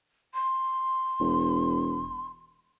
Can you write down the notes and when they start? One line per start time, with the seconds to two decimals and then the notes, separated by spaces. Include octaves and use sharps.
0.34 C6
1.20 E1